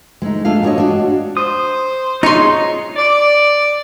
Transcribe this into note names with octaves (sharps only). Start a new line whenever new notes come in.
G#3 A3 C#4 D#4
A3 D4 F4 G#4 F5
G#3 B3 D4 F#4 C#5 D#5
D4 F#4
C5 D#6
D#4 F4 G#4 C#5 C6
D5